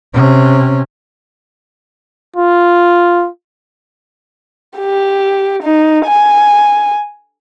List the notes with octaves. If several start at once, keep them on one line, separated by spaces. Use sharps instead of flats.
C3 C#4
F4
G4
D#4
G#5